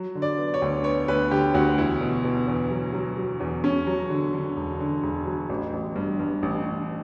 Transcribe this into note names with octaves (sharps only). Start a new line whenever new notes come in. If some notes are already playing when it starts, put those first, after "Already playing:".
Already playing: F#3
D3
D5
B3
C#5
D2
B3 C#5
D2 B4
D3 G4
D2 F#4
E2 E4
B2
B2
E2
F#3
F#3
F#3
E2
E1 C#4
F#3
D3
D3
E1
D3
E1
F#3
A1
A1
G2
G2
A1
A1